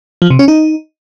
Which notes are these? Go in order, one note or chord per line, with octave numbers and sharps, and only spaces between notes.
F3
C3
C#4
D#4